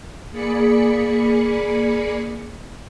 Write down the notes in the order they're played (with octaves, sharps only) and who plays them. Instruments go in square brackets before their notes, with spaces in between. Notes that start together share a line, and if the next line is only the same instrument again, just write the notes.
[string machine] A#3 G#4 D5 B5 C#7